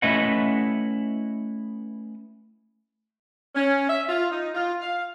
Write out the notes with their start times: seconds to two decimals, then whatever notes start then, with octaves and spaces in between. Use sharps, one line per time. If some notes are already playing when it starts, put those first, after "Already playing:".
0.02 A3 C#4 E4 B4 D#5 F#5
3.55 C#4
3.87 E5
4.08 F4
4.31 D#4
4.53 F4
4.81 F5